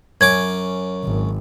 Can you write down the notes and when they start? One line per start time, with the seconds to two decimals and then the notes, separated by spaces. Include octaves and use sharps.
0.21 F#2 C#4 D6 G#6
1.04 G#1